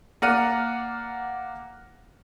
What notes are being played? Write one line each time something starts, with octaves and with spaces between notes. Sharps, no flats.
A#3 D5 F#5 F6 D#7